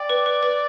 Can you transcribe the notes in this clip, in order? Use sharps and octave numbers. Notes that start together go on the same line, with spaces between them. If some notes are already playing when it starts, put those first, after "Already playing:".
Already playing: D5 G5
B4
B4
B4